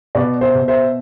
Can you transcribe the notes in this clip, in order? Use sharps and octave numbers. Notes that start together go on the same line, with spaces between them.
B2 B4 D5
C5 E5
B2
C5 E5